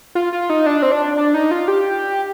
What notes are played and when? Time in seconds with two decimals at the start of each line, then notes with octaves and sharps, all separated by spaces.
0.15 F4
0.33 F4
0.50 D#4
0.66 D4
0.82 C4
0.92 D4
1.17 D4
1.34 D#4
1.51 F4
1.68 G4